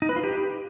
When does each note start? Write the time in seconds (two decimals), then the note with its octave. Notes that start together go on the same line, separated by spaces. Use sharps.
0.02 D#4
0.09 B4
0.16 F4
0.23 G4